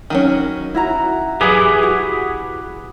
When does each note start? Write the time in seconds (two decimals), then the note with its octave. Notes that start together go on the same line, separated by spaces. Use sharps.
0.10 D#3 F#3 C#4
0.75 E4 F#4 A#5
1.41 E3 F#3 G4 G#4 B4
1.83 F#4